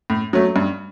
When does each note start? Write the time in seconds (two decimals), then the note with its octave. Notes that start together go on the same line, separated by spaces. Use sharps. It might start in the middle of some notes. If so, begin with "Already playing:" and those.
0.10 A2
0.33 F#3 A3
0.56 G2